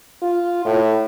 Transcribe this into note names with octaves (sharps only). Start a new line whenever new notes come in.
F4
A2